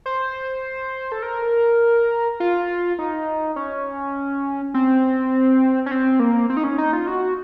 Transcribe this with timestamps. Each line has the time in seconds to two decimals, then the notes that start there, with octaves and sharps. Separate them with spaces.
0.06 C5
1.12 A4
1.23 A#4
2.40 F4
2.99 D#4
3.56 C#4
4.74 C4
5.86 C#4
5.91 C4
6.20 A#3
6.50 C4
6.57 D#4
6.64 C#4
6.78 D#4
6.93 F4
7.07 F#4